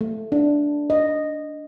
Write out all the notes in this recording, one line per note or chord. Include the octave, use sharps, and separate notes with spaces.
A3
D4
D#5